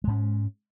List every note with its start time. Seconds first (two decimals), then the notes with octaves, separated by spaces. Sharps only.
0.04 G#3
0.07 G#2
0.10 C#4